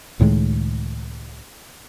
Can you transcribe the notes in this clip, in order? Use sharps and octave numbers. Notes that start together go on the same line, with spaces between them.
C#2 A2 D#3 G#3